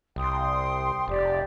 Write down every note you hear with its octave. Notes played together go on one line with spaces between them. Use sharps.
C2 G5 C6 D#6
F1 G4 D5